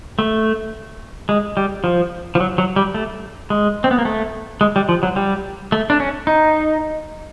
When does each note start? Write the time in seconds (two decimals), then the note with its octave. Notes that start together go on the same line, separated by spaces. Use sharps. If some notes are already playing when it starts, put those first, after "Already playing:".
0.19 A3
1.29 G#3
1.57 G3
1.84 F3
2.35 F3
2.40 F#3
2.58 F#3
2.76 G3
2.94 A3
3.50 G#3
3.84 C4
3.91 B3
3.98 A#3
4.05 A3
4.61 G#3
4.76 G3
4.89 F3
5.03 F#3
5.16 G3
5.72 A3
5.90 D4
6.00 C#4
6.27 D#4